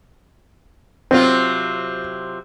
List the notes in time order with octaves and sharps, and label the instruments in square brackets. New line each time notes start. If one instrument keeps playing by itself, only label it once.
[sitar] C3 F#3 F4 [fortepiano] C4